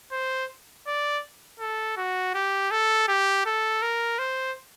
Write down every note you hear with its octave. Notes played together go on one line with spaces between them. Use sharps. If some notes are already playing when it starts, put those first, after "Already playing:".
C5
D5
A4
F#4
G4
A4
G4
A4
A#4
C5